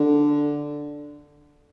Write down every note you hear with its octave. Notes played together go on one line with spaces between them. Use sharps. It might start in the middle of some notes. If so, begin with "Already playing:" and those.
Already playing: D3